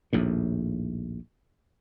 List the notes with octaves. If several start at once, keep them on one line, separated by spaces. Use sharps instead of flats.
A#1 D#2 A2